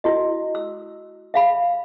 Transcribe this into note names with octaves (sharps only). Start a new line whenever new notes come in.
E4 F#4 D#5
E6
E5 F5 B5